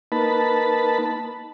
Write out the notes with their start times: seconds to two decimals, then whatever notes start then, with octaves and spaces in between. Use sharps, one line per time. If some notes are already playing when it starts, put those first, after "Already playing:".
0.12 A#3 D#4 B4 A5 B5